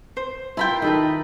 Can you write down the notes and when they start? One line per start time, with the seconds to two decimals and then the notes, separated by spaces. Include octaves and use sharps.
0.17 C5
0.57 E4 F4 A#4 G5 B5 C6
0.82 D#3 A4 B4